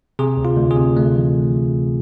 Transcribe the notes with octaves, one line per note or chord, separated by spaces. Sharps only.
C3 G#4
D2
F4
D2
G#4
C3
D2 A3
E3